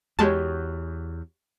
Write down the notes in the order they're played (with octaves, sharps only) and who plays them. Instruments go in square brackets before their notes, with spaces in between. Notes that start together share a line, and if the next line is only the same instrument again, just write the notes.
[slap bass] E2 [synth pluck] G#3 A5 [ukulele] F#4 G4 C#5